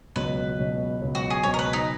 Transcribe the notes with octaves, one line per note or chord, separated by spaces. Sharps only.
C#2 B2 F#3 B4
C#2 B2 F#3
C#2 B2 F#3
F#4
G#4
C#2 B2 F#3 C#5
A#4
B4
D#4